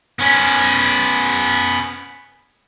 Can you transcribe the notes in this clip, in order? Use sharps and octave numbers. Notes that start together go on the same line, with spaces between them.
B3 C#4